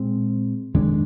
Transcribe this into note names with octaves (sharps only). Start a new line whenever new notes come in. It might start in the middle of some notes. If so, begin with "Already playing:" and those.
Already playing: A#2 G#3 C4
F2 D#3 G#3 D4